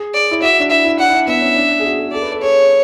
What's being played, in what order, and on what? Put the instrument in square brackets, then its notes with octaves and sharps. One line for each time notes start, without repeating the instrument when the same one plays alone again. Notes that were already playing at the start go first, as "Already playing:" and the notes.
Already playing: [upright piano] G#4
[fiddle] D5
[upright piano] E4
[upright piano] F#4 [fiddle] E5
[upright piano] D4
[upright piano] E4 [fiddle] E5
[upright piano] E4
[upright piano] D4 [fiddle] F#5
[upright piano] E4
D4
[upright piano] B3 [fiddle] E5
[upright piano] C#4
D4
G#4
F#4
G#4
[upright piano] A4 [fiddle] D5
[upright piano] B4
A4
[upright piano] G#4 [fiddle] C#5